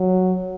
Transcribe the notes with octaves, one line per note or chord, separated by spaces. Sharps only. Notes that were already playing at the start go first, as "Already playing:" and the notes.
Already playing: F#3